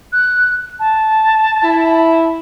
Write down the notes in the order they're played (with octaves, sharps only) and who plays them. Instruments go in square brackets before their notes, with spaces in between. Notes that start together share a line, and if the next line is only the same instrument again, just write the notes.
[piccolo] F#6
A5
[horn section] E4